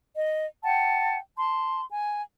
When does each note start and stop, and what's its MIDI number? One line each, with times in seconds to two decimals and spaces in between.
0.16 0.46 75
0.64 1.18 78
0.64 1.18 79
0.64 1.18 81
1.38 1.81 81
1.38 1.81 84
1.91 2.22 80